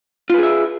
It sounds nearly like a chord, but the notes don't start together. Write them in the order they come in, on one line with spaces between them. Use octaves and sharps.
F4 B4 G#4 E5